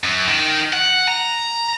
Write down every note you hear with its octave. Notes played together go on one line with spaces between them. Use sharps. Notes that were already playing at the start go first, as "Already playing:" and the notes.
F#2
D#3
F#5
A#5